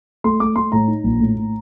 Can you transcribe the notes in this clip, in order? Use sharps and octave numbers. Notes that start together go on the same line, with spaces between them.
A3 C6
A3 D6
A3 C6
A2 A#5
D#4
A#1
A2
A2